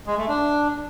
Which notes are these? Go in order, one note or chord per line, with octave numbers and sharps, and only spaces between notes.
G#3
A3
D4